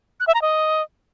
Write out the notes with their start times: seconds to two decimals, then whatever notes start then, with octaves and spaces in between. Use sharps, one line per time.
0.20 F#6
0.27 E5
0.35 A#5
0.42 D#5